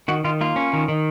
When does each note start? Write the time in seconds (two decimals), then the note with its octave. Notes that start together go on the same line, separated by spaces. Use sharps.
0.08 D#3 F#4
0.24 D#3 F4
0.41 A#3 F4
0.56 C#4
0.73 D#3
0.88 D#3